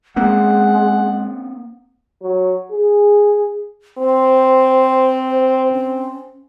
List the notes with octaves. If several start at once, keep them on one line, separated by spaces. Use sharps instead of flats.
G#3 A#3 C4 C#4 F#5
F#3
G#4
C4 C5
C#4